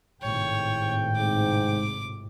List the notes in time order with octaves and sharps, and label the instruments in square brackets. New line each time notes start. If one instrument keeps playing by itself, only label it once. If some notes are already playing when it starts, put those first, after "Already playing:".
[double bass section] G#1 A2 C3 [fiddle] C#5 [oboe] G5
[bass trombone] G#2 [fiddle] D6